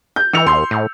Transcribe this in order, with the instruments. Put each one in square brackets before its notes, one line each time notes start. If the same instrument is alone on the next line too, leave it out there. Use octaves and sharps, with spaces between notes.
[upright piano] G6
[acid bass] E3 [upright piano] E6 C#7 F7
[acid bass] D#2 [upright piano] C6
[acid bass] A2